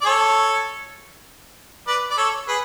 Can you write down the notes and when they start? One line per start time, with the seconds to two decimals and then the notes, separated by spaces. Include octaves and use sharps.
0.01 D5
0.05 A4 C#5
1.87 B4 D5
2.10 D5
2.17 A4 C#5
2.48 G#4 B4